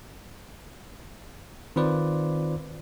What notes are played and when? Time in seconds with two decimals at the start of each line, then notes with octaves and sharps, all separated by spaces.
1.76 D#3 C4 F4 B4 C5 D5